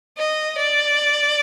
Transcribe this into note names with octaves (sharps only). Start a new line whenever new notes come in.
D#5
D5